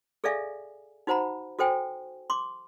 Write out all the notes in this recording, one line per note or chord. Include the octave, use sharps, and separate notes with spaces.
G#4 A4 D5 E5 F5 G#5
D#4 F#4 C5 F#5 A#5 B5
F#4 A4 C5 G5 G#5
C6 D6